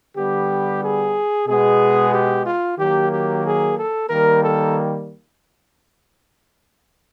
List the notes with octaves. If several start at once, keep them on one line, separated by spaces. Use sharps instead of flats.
D3 G3 B3 G4
G#4
B2 G#3 B3 G#4
G4
F4
D#3 F#3 A#3 G4
G4
G#4
A4
D#3 G3 A#3 A#4
A4